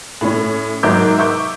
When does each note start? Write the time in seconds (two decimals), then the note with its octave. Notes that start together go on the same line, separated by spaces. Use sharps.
0.21 A2 C#4
0.83 G#2 F#3 A#4 E5 D6 G6
1.18 E5 C#6 D6 G6